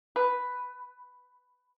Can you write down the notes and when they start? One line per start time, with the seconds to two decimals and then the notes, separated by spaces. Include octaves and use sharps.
0.16 B4